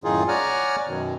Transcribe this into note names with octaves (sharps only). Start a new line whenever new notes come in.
F#2 A2 D#3 D#4 F4 G#4
C#5 D5 F#5 G#5 A#5 F6
F#2 B2 D#3